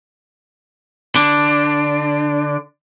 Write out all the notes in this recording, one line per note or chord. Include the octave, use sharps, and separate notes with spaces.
D3 D4